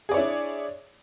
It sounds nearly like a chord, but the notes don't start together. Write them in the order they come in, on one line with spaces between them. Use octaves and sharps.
G#4 D5 C#5 E4 D4